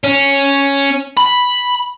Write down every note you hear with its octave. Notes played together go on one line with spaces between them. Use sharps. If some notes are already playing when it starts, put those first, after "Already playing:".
C#4
B5